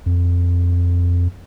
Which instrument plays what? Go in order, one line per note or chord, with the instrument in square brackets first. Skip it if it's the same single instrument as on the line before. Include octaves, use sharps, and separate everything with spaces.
[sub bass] F2